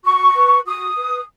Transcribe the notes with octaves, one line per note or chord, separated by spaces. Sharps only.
F#4 C#6
B4
F#4 D#6
B4